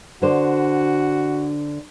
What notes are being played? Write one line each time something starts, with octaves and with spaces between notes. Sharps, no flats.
D3 D4 F#4 C5